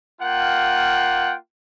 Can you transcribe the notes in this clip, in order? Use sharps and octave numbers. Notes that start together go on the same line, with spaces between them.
A#3 F4 F#5 G5